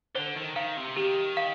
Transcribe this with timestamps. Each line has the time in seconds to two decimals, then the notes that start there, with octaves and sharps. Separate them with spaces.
0.15 D3 C5
0.36 D#3
0.56 D#3 F5
0.77 C3
0.96 D#3 G4
1.37 F5